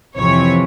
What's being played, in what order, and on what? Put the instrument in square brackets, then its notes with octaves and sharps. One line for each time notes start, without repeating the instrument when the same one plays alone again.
[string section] F2 C3 E3 C#5